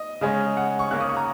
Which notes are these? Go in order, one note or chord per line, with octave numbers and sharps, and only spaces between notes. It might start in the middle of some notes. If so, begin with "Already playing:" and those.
Already playing: D#5
C#3 G#3 C#4
F#5
C#6
C#3 A#3 C#4 F#6
D#6
C#6
A#5